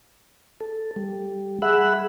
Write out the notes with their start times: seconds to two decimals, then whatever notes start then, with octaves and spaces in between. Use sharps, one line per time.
0.60 A4
0.96 G3
1.62 G#4 E5 F#5 B5 E6 F#6